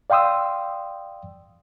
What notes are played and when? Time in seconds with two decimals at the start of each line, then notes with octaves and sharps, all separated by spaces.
0.10 D5 F5 G5 C6 D#6 E6